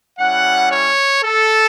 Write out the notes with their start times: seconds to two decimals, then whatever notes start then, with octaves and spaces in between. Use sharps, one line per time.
0.19 G3 C#4 E4 F#5
0.72 C#5
1.24 A4